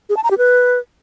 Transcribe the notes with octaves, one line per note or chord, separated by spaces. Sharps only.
G#4
A5
A#5
G4
B4